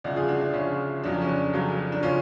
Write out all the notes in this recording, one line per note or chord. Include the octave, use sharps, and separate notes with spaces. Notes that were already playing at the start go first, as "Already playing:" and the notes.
D2 C#3 F3 D5 F#5
F4 G#4
D4 F#4
D4
D2 C#3 F3 C#4
F1 F2 C#3 F#3 D4
C#4
D4
F1 F2 C#3 F#3
D4
C#3 C#4 F4